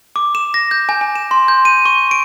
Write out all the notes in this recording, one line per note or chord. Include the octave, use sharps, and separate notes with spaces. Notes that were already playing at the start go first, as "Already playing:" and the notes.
D6
E7
A#6
G6
G#5
G#5
E7
C6
G6
D#7
C#6
D7